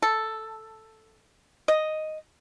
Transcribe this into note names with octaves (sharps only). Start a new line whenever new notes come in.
A4
D#5